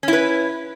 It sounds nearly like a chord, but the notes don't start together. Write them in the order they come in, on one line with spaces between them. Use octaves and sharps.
C#4 E4 B4